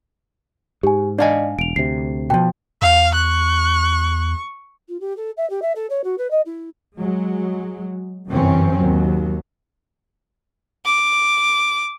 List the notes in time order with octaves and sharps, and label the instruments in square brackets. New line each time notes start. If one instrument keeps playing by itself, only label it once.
[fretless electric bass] G#2 [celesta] G4 G#5
[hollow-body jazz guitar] D4 F5 G#5 [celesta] D5 D#5
[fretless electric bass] E1 [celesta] D7 F7
[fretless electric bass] D2 C3 [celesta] C7
[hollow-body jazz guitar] B2 F3 [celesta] G5
[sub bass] E2 [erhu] F5
[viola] C#6 [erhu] F#6
[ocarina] F4
G4
A4
E5
G4
E5
A4
C#5
F#4
B4
D#5
E4
[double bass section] F#3 G#3
G1 F#2 C3 E3 C4 C#4
D#2 F#3
[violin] D6